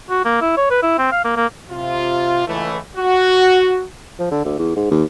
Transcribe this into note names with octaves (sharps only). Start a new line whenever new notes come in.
F#4
A#3
E4
C#5
B4
E4
C4
F5
A#3
A#3
C3 F4
C#2 E3 A3
F#4
F3
D3
D2
E2
G#2
D#2